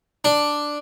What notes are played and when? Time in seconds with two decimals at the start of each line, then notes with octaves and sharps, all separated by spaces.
0.24 D4